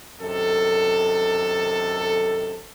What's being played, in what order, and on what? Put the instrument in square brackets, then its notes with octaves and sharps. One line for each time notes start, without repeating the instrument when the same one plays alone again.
[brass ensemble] F#2 C3 D#3 A4